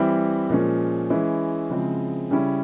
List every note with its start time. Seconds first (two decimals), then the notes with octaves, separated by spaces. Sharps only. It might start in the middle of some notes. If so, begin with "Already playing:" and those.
Already playing: E3 G3 C4 E4
0.49 A#2 F3 G#3 C#4
1.10 E3 G#3 C#4 E4
1.70 C#3 F3 G#3 C4 E4
2.31 C#3 G3 C#4 E4